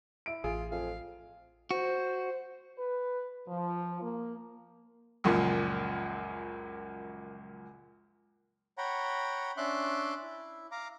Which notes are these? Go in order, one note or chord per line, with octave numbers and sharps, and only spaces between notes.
E4 D7
A1 F4 G#4
F2 F5
F#4 C5
B4
F3
A#3
C#2 F#2 A#2 F3
C#5 F#5 G5 A#5 B5
C#4 D4 E5 C6 D6 F#6
E4
F5 A#5 D6